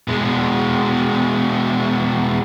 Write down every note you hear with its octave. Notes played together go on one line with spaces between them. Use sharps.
B2 G#3